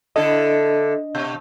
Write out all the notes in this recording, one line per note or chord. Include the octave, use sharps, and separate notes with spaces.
D3 D4 E4 A4 D#5
B2